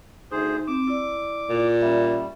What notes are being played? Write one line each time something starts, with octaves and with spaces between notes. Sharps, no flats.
D2 D#4 G#4 C5
C4 D6
E4 D5
A#2
G3 C#4 E5